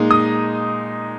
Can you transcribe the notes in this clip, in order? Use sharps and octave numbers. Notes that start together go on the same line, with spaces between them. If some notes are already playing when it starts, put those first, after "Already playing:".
Already playing: A#2 G#3 D#4
D#6